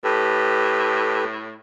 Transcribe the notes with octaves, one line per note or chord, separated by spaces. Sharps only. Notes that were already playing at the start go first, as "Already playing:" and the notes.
A2 G4 A4 B4